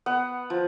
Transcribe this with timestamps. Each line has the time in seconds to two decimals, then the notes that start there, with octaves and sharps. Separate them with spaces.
0.06 B3 F#5
0.50 F3